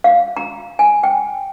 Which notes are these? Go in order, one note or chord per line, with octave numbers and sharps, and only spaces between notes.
F5
A#5
G#5
G5